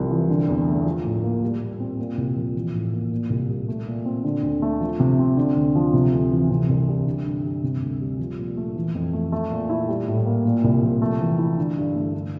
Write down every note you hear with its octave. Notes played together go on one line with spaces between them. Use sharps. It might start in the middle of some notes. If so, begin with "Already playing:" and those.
Already playing: C2 C3 F3
E3
D3
E2
A3
F3
A2
A#3
G3
A#2
C4
A#2
C2
F3
E3
A2
A#3
A#2
C2
G3
A3
A#2
C4
D3
D2
A3
F3
C3
C4
D3
D2
F3
C3
D2
E3
C3
C2
G3
D3
G2
G3
C3
D2
G3
F3
A#2
A3
E3
F2
A3
A3
A#2
E4
G3
A2
A#3
A#2
C2
F3
A3
E3
E4
D3
G2
A3
D3